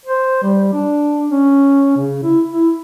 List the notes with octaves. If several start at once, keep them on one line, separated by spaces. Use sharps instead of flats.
C5
G3
D4
C#4
C#3
E4
E4